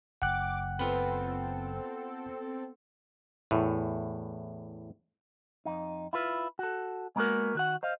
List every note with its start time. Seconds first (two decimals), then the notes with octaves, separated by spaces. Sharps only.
0.22 F#1 F#5 G5 D6 F#6
0.79 B3 C4 F4 A4
3.51 E2 A2
5.66 F2 D#4
6.13 E4 F4 B4
6.59 F#4 A4
7.16 G#3 A#3 B3 C#4 F#4 A#4
7.55 D#3 F#4 F#5
7.83 C5 D#5 F5